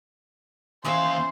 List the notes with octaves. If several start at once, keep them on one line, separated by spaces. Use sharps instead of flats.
D#2 C#3 E3 C5 E5 F5